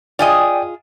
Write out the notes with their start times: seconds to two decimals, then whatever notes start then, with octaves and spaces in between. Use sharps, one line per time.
0.19 F4 G#4 D5 D#5 G5 G#5